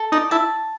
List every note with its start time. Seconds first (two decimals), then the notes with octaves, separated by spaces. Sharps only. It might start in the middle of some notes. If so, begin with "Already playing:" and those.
Already playing: A4
0.12 D#4 D5
0.31 E4 A5